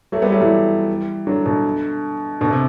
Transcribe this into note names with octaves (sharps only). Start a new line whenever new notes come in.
F#3 A3
G3 B3
F#3 A3
E3 G3
D3 F#3
B2 D3
B2 D3
C3